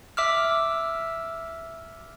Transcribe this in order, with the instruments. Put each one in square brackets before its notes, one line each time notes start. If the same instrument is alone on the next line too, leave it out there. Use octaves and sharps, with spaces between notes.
[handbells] E5 D6 E6 F6